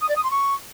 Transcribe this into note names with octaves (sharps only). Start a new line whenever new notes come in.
D#6
D5
D#6
C6
C#6